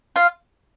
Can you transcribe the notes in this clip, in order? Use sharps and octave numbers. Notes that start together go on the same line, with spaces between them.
F4 F5